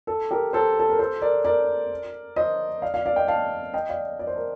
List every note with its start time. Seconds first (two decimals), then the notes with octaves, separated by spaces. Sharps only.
0.07 A4
0.31 G4 A#4
0.53 A4 C5
0.79 A4
0.90 A#4
0.99 A4 C5
1.22 A#4 D5
1.44 A#4 D5
2.36 C5 D#5
2.82 D5 F5
2.94 D5 F5
3.06 D5 F5
3.16 D#5 G5
3.27 F5 A5
3.74 D#5 G5
3.89 D5 F5
4.19 D5
4.27 C5
4.36 A#4